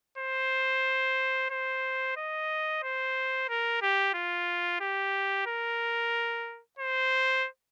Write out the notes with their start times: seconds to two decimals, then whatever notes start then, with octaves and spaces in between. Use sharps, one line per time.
0.18 C5
1.51 C5
2.17 D#5
2.83 C5
3.49 A#4
3.82 G4
4.14 F4
4.81 G4
5.47 A#4
6.79 C5